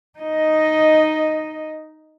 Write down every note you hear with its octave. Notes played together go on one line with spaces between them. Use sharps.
D#4 D#5